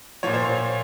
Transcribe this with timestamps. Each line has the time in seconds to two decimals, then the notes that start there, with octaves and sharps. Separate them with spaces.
0.23 A#2 F3 C#5
0.34 C5
0.45 C#5